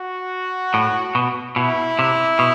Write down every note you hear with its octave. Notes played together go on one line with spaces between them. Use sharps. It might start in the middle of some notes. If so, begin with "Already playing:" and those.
Already playing: F#4
A2
B2
B2 E4
C3
B2